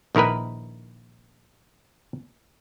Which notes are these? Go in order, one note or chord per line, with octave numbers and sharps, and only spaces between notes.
A#1 D#3 E4 A#4 B4